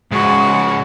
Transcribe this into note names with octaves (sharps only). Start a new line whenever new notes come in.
G#2 C#3 G#3 F#4